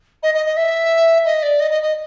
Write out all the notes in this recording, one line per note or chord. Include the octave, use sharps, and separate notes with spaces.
D#5
D#5
D#5
E5
D#5
D5
D#5
D#5
D#5